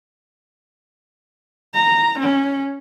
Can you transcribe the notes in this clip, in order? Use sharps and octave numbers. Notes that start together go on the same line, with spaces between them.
A#5
C#4